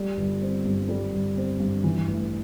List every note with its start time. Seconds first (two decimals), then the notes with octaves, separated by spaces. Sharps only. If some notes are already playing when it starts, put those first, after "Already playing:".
Already playing: G3
0.17 G1
0.42 C4
0.66 G2
0.89 G3
1.13 G1
1.37 C4
1.60 G2
1.84 E3
2.08 A1